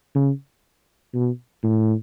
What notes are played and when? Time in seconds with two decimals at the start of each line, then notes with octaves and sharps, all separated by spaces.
0.15 C#3
1.14 B2
1.64 A2